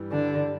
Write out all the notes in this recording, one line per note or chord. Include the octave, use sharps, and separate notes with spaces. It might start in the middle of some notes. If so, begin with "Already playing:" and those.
Already playing: G2 E3 G3
D3 D4